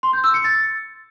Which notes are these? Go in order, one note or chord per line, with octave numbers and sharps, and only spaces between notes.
C6
G6
E6
C#7
A6